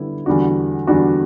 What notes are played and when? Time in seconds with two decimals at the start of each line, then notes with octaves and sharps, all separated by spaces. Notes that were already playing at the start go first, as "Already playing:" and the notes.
Already playing: D3 G3 B3 E4
0.26 E2 D3 G3 D4 F#4
0.87 E2 D3 G3 D4 F#4